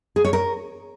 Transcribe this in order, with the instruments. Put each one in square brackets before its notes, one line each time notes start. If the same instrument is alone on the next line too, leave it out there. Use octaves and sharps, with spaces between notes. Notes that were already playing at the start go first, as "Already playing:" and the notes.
[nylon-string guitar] G#4
C#5
A#4